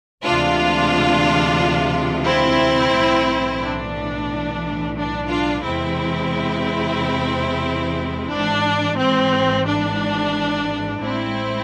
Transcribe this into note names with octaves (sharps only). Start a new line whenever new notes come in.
D2 C3 E3 G#3 D4 F4
C4 E4
B1 A2 E3
D4
D4
D4 F4
E2 C3 E3 G#3 C4 E4
G#1 G#2 E3 D4
C4
D4
A1 A2 G#3 C4 E4